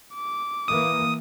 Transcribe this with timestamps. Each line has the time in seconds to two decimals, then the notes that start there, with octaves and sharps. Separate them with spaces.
0.14 D6
0.68 E3 A#3 D#6